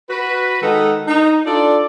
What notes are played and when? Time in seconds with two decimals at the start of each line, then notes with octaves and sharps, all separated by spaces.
0.10 F#4 B4
0.62 D#3 G#3 D#4 A4 F#5
1.07 D#4
1.46 D4 F4 A4 D5